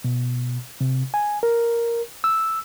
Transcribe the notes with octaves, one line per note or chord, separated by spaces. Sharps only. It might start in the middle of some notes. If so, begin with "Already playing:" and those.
B2
C3
G#5
A#4
E6